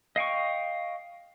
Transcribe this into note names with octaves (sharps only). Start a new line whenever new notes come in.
D#5 F5 G5 C#6